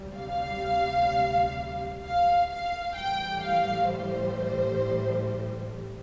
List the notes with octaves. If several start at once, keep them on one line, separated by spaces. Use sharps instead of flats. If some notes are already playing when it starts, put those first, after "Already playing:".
Already playing: D2 C3 G3
F5
F5
F5
A2 E3 G3 G5
F5
C5